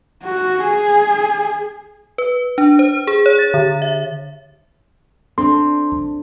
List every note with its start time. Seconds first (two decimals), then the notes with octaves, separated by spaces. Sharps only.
0.23 F#4
0.65 G#4
2.18 B4
2.58 D4
2.79 C5
3.07 G#4
3.26 C#5
3.39 A6
3.54 D3
3.82 E5
5.38 C4 D4 A4 C6